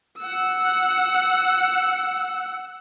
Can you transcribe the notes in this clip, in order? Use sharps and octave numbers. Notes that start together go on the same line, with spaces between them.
F#5 E6